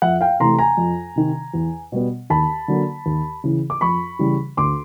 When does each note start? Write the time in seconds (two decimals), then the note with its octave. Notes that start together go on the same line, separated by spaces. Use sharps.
0.02 F2 E5 F#5
0.21 F5 G5
0.40 C3 E3 A3 A#5 C6
0.59 G#5 A#5
0.77 F2
1.16 C3 D#3
1.54 E2
1.92 B2 G3 B3
2.30 D#2 A5 B5
2.68 D3 F#3 A#3
3.06 D#2
3.44 C#3 E3
3.70 D6
3.81 F2 B5 C#6
4.19 C#3 E3 G3
4.57 D2 C6 D6